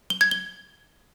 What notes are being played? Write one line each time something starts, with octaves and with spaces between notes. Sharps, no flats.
G7
G#6
G7